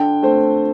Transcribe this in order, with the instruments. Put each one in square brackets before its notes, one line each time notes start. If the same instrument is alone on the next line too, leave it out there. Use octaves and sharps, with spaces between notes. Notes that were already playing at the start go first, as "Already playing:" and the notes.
Already playing: [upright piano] D3 G5
A3 C4 C5